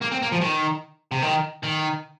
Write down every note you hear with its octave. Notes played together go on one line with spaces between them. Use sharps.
A#3
C4
A#3
F3
D#3
C3
D#3
D#3